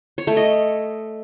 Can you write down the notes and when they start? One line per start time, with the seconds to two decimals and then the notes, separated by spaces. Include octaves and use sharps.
0.18 C#5
0.27 A3
0.37 D#5